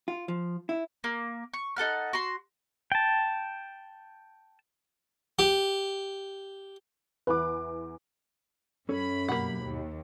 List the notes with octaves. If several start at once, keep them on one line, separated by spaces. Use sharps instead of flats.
F4
F3
E4
A#3
C#6
D#4 A4 F#5 F6
F#4 C6
G5 A5
G4
E2 E3 B4 D6
F#2 C#4 A4 C#5 B5
B1 G2 A#3 G4 F#5
D#2